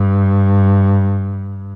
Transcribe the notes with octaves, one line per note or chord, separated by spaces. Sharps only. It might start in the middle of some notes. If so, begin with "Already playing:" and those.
Already playing: G2